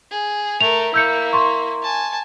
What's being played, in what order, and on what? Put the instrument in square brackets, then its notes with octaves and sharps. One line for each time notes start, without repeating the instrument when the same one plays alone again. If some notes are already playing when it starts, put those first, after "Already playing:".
[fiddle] G#4
[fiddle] A3 A#4 [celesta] F7
[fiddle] A#3 E4 [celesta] E6 G6 C#7
[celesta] C6 C#6
[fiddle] G#5 A5